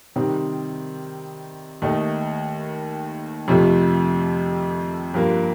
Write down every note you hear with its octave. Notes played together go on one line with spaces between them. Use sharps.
C3 D#3 G3 C4 D#4
D#2 D#3 A3 D#4
F2 C3 F3 A3
G2 F3 A#3